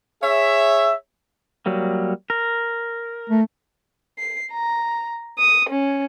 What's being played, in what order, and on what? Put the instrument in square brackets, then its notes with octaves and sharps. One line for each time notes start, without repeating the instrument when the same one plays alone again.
[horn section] G#4 C#5 E5
[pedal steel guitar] F#3 G3 A#3
A#4
[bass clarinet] A3
[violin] C7
A#5
D#6
C#4